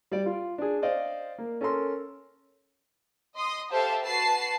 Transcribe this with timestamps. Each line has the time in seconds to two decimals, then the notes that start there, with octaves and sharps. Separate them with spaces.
0.11 G3 D5
0.26 F4
0.58 D4 G#4
0.82 C5 D5 D#5 F5
1.38 A#3
1.61 C#4 A4 A#4 C6
3.35 D#5 C6 D#6
3.71 G4 A4 C5 E5 F5 A5
4.04 F#4 B4 A5 C7